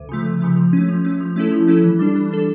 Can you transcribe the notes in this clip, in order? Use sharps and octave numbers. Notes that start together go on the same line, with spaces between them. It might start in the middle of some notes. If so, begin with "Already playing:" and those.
Already playing: D2
C#3 F3 A3
D2
C#3 F3 A3
F3
A3 C#4
F3
A3 C#4
F3
A3 C#4 E4 A4
F3
A3 C#4 E4 A4
E3
G3 D4 A4
E3
G3 D4 A4